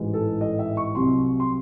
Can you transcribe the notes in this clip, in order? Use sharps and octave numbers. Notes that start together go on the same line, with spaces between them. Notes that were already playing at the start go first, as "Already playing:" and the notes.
Already playing: A1 G#2 E3 G#3
A4
D#5
E5
C#6
C2 C3 F#3 C6
C6